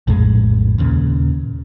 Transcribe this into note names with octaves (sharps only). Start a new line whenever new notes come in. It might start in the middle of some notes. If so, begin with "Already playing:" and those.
A#1 F2 A2 G#3
D#2 A#2 C#3